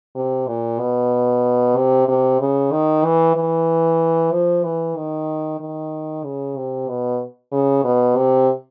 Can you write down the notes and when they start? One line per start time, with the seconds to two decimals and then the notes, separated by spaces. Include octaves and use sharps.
0.15 C3
0.48 A#2
0.80 B2
1.77 C3
2.08 C3
2.40 C#3
2.72 D#3
3.05 E3
3.36 E3
4.31 F3
4.64 E3
4.96 D#3
5.60 D#3
6.24 C#3
6.56 C3
6.88 B2
7.52 C#3
7.84 B2
8.17 C3